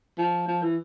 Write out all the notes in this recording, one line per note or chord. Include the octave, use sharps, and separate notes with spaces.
F3
F3
E3